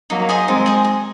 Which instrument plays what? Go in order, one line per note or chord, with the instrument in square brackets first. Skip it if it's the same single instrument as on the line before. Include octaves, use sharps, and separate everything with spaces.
[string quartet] F#3 A#3 [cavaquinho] D#4
[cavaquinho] G#4 C5 D#5
[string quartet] G#3 C4 [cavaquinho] D#4
[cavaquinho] G#4 C5 D#5
G#4